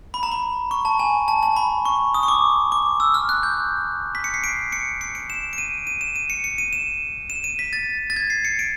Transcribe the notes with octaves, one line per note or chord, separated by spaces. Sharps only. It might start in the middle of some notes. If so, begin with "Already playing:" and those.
B5
A#5
B5
C#6
A5
G#5
A5
A5
B5
C#6
D#6
C#6
D6
D6
E6
F6
F#6
G6
B6
C#7
C7
D7
C#7
C#7
D7
E7
D7
D#7
D#7
E7
D#7
C#7
C#7
D#7
E7
E7
D#7
B6
A6
A6
G#6
C7
C#7
D7